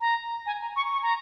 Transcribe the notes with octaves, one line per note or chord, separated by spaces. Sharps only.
A#5
G#5
A#5
C#6
C#6
A#5